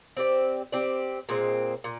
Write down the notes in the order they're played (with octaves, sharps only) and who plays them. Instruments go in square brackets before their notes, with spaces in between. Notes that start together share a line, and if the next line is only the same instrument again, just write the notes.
[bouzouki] C4 G4 D5
C4 G4 D5
A#2 G#3 C4
A#2